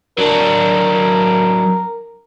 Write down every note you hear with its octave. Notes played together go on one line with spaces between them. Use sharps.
F#3 D4 A#4